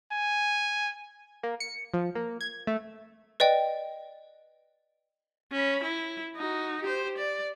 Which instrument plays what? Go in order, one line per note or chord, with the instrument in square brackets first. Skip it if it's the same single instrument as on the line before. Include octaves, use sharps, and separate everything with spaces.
[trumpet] G#5
[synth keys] A#3
C#7
F3
A#3
G#6
A3
[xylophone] B4 D5 D#5 G5
[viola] C#4 B5
E4
D#4 F#4
G4 C5
D5